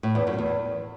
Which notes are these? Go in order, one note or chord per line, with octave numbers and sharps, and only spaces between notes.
A2
E2
F#2
E2